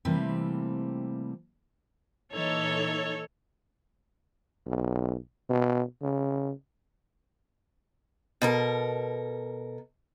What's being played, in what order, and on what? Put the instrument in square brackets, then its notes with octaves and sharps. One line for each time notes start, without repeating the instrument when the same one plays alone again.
[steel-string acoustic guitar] C3 E3 G3 A3 A#3 C4
[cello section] A#2 E3 D#4 [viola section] A4 C#5
[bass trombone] B1
B2
C#3
[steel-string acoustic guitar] B2 A4 A#4